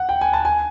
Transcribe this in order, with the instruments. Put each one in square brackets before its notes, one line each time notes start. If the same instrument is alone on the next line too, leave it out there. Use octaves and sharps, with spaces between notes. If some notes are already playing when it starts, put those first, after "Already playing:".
Already playing: [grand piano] F#5
G5
G#5
A5
G#5